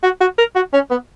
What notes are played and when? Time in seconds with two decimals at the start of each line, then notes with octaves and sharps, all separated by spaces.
0.03 F#4
0.21 F#4
0.38 A#4
0.56 F#4
0.73 C#4
0.91 B3